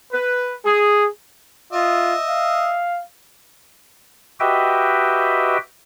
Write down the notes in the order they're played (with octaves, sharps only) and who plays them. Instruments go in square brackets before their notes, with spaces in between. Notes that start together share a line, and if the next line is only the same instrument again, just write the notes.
[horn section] B4
G#4
[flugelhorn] F4 [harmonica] D#5 E5
[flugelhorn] F5
[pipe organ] F#4 G4 B4 D#5 E5 G5